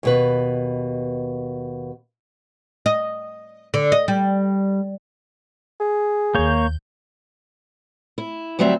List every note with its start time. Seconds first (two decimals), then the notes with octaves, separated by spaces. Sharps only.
0.03 D#2 B2 B4
2.86 D#5
3.74 D3
3.92 D#5
4.08 G3
5.80 G#4
6.35 D#2 A#3 C#5 G6
8.18 E4
8.59 D2 F#3 G3 C4 E5